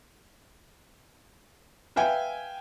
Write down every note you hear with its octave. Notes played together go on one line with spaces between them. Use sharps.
B4 E5 F5 G5 G#5